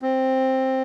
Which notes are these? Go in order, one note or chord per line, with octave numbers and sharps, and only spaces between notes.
C4